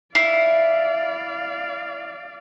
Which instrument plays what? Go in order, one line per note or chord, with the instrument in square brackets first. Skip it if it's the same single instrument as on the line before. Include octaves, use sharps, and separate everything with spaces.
[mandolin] E4 [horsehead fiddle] D5 F5 [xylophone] C7